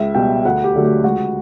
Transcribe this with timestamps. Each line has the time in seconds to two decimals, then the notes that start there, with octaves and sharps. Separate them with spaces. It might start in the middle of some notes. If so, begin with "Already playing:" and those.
Already playing: C#2 E5
0.15 B2 G3 G5
0.45 D2 F#5
0.64 G4
0.75 D3 F#3 A3
0.84 G4
1.04 C#2 F#4